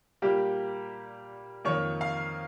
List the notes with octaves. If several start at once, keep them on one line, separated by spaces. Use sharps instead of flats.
A#2 G3 A#3 G4
F2 D#3 A#3 C#5
F5